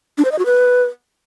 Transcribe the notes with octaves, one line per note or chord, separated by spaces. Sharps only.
D4
C5
D#5
F#4
B4